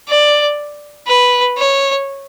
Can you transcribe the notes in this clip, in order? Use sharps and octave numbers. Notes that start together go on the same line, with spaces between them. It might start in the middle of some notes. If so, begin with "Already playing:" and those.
D5
B4
C#5